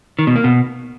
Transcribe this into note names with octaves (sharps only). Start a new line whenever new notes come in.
D#3
B2
A#3
B2